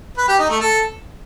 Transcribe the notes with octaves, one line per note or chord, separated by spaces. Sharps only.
B4
G4
D#4
A3
A4